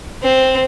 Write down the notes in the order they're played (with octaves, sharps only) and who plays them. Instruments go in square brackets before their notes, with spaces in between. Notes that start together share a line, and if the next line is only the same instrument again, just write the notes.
[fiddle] C4